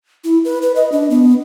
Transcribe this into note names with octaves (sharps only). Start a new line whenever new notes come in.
E4
B4
B4
D#5
D4
B3